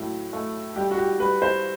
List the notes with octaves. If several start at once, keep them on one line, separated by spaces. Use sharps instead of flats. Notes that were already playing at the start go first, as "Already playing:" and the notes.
Already playing: A2 F#3
A3
G3 G4
F#4
G4
G3 B4
C5